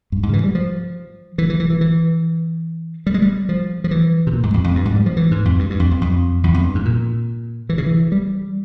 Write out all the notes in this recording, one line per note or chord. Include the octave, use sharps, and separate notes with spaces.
G2
G#2
C#3
E3
G3
F3
E3
E3
E3
E3
E3
G3
G#3
G3
F3
F3
E3
C3
A#2
G#2
F2
F2
G2
G#2
G3
F3
E3
G#2
F2
G2
G2
F2
F2
F2
E2
F2
G2
G#2
A#2
E3
C#3
E3
G3